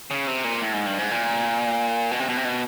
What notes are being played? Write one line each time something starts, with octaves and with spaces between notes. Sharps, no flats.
C#3
C3
A#2
A2
G#2
G2
G#2
A#2
B2
C3
B2
C3
B2